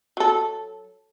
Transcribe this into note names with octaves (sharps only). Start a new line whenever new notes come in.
F#3 A4